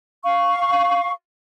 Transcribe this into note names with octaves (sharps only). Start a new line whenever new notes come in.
F5 C#6